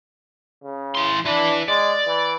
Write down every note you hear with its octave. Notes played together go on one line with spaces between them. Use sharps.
C#3
E3 C6
E3 D4 B4
G#3 D5
E3